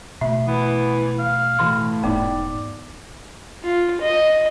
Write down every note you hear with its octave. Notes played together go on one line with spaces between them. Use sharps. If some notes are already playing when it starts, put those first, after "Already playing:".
B2 A3 E5
E3 B3
F5
A2 E3 C6
E1 G#2 B3 D#4 D5
F4
D#5